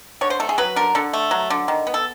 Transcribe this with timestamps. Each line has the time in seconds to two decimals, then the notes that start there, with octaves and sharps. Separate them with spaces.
0.21 D3 C#5
0.30 C5
0.40 A3 A4
0.49 G#4
0.58 F#3 B4
0.76 D3 A#4
0.95 D3 A4
1.13 A3
1.31 F#3
1.50 D3
1.68 D#3
1.87 B3
1.94 A4